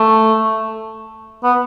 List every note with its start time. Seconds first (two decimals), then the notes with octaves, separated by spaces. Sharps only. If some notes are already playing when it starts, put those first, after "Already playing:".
Already playing: A3
1.44 B3